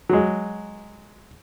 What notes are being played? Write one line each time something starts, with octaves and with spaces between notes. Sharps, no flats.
F#3 G#3